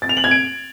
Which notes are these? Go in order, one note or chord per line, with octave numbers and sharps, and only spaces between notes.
A6
F7
F#7
G#6
D7